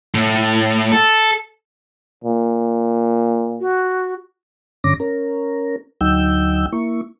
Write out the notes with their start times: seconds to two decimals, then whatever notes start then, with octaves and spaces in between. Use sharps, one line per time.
0.15 A2
0.92 A4
2.24 A#2
3.61 F#4
4.84 G2 D3 C#4 D6 A#6
5.00 C#4 A#4
6.01 D2 F#3 D#4 G5 E6 G6
6.72 A#3 E4 C#6